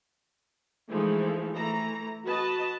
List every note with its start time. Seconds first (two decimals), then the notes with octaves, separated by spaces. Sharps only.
0.89 E3 F3 G#3 A3 D#4
1.55 E3 A3 A#5
2.26 F#4 B4 D#5 A5